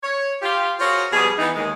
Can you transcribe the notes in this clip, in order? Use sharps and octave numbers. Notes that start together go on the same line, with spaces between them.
C#5
F4 G4
F4 F#4 G#4 A#4 C5 C#5
B2 F3 G3 B3 G#4
E3 B3 D#4
D#2 G#3